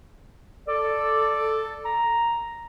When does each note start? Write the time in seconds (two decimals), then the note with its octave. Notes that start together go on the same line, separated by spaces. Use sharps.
0.68 A4 D5
1.85 A#5